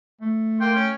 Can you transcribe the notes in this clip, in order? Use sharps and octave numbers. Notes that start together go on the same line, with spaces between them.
A3
A#3 G5 C6
C#4